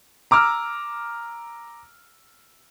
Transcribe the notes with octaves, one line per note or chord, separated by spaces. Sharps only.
A#5 D6 E6 F6